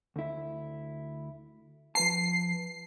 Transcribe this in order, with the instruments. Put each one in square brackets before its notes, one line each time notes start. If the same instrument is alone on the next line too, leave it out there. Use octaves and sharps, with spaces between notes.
[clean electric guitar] D2 E4
[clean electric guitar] F3 B4 A5 [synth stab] C7